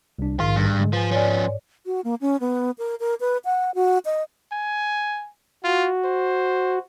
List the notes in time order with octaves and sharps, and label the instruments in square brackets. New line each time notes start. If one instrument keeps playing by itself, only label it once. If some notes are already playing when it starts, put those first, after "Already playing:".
[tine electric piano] C2 D4
[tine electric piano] A#1 D#3 [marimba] G#2 [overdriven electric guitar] F4
[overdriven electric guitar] G2
[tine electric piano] D3 G#3
[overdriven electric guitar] F3 [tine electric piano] B4 G#5
[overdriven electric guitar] F3 C#4 [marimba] C#5 D5
[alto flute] F#4
A#3
C#4
B3
A#4
A#4
B4
F#5
F#4
D#5
[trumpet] G#5
[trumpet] F4 [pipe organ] F#4
[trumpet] C5